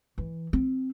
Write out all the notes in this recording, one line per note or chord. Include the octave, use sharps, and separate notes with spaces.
E3
C4